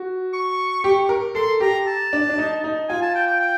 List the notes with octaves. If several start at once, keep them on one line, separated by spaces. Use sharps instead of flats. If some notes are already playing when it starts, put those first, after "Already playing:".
Already playing: F#4
C#6
G4
A#4
A4 C6
G4 A#5
A5
D4
D4
D#4
D#4
F4 G#5
A5
G5
G5
G5